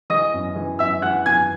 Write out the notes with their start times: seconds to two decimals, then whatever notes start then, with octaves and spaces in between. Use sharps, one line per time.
0.10 E3 D#5 D#6
0.34 F#2
0.56 E3
0.79 F#2 E5 E6
1.02 E3 F#5 F#6
1.26 F#2 G#5 G#6